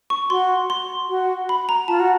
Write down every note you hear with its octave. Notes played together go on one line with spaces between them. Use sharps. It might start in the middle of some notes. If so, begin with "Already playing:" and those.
C#6
F#4 C6
C6
F#4
B5
A#5
F4 A5
F#4